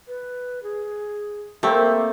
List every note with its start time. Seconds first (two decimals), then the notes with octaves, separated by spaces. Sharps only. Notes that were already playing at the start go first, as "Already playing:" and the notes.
0.08 B4
0.63 G#4
1.63 A3 A#3 C4 G4 C5 E5